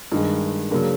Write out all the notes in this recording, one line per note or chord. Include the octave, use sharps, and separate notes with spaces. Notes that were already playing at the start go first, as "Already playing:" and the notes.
G2 D#3 G#3
C#3 F#3 A#3 D4